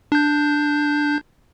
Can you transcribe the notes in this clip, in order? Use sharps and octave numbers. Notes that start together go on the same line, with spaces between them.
D4 G6